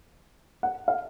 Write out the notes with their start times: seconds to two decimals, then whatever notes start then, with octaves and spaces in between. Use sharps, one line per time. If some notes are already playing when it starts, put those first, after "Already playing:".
0.63 F#5
0.88 F5